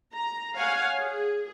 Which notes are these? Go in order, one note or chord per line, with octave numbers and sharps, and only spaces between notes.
A#5
C#5 F5 F#5 G#5
G#4